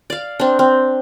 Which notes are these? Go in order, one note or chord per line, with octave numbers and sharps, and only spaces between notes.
D5 F5
C4 D4
C4